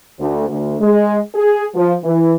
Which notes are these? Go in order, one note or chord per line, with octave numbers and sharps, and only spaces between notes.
D2
D2
G#3
G#4
F3
E3